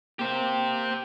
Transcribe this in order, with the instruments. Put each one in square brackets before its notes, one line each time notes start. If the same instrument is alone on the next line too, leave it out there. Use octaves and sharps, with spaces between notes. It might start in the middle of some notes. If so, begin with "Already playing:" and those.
[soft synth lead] A#3 [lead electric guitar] G4 C5